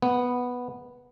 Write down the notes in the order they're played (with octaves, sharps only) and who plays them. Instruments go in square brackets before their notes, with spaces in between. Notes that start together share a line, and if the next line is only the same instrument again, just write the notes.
[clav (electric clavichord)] B3